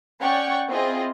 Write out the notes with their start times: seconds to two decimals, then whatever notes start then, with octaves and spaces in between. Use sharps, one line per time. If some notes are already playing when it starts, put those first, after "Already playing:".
0.20 C#4 C#5 D5 F#5 G5 C#6
0.69 C4 E4 F4 G#4 D#5